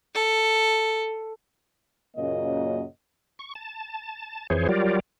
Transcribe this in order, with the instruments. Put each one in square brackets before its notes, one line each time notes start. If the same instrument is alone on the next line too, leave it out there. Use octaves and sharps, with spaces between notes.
[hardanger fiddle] A4
[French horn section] F#2 A#2 C#3 A#3 C#5 D#5
[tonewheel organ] C#6
A5
F2 E3 G#4 C5 C#5
F#3 G3 F4 G4 A#4 D5